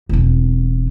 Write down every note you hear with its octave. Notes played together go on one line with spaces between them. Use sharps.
E1 C4